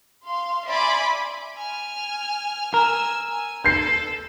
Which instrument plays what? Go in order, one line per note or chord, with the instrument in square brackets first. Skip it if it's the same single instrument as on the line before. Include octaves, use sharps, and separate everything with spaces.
[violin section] F5 C6
D5 E5 G#5 B5 C6 D6
[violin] G#5 F6
[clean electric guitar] A#4 [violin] G#5 E6
[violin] G#5
[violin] A4 [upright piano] G6 C7